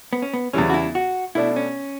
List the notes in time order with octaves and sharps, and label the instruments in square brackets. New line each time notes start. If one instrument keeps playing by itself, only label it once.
[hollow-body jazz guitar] B3
C#4
B3
[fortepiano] E2 C#3 E3 G3 [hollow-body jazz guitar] C#4
[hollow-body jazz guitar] F#4
E4
F#4
[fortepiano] B2 A3 D4 [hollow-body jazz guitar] E4
[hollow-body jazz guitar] C#4